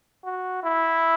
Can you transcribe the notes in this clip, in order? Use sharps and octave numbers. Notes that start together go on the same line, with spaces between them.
F#4
E4